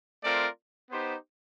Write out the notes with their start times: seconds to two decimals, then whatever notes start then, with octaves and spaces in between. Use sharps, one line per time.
0.23 A3 C4 F4 A#4 D5
0.91 B3 D#4 G4 C5